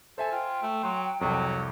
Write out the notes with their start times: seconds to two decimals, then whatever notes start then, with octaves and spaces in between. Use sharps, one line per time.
0.18 A4 C5 E5 G#5
0.32 F4 G5
0.62 A3
0.83 F#3 C6
1.21 C2 F2 F#3